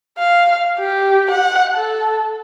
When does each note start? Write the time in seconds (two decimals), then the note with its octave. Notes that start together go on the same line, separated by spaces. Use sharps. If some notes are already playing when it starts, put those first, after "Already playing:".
0.18 F5
0.79 G4
1.31 F#5
1.74 A4